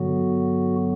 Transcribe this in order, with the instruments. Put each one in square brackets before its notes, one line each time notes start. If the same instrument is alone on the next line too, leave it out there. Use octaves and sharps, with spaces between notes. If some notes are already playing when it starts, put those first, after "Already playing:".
Already playing: [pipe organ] G2 D3 F#3 B3 F#4